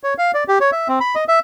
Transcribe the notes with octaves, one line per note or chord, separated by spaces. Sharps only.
C#5
F5
D5
G4
C#5
E5
C4
B5
D#5
E5